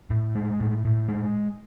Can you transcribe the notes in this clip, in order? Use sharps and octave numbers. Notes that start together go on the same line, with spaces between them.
A2
G#3
A2
A2
G#3